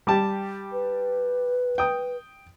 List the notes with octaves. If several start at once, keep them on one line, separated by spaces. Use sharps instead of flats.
G3 G4 A5
B4
G5 D#6